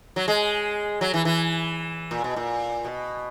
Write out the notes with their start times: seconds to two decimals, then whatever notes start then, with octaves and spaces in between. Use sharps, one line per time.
0.16 F#3
0.28 G#3
1.01 F#3
1.14 E3
1.25 E3
2.11 A#2
2.24 B2
2.36 A#2
2.85 B2